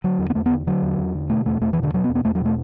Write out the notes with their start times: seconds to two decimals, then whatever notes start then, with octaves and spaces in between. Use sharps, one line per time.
0.04 D3 F#3
0.19 E2
0.30 B3
0.35 E2 A3
0.46 B3
0.50 D3
0.67 D3 F#3
0.83 E2
0.99 E2
1.14 D3
1.30 B2 A3
1.46 E2 A3
1.61 E2 A3
1.73 E3
1.78 B2
1.83 D3
1.93 B2 F#3
2.04 B3
2.09 E2
2.15 B3
2.25 E2 A3
2.35 F#3
2.41 B2 A3